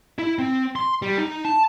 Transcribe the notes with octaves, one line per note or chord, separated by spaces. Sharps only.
E4
C4
C6
G3
D#4
A5